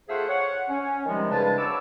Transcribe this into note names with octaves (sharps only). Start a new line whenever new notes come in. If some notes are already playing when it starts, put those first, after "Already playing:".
A3 F4 G#4 C5 E5 F#5
C#5 F#5
C#4
C3 D#3 F3 G3 G#3
C2 G2 C#3 G#3 B4 A5
F#3 B4 C#5 D6 E6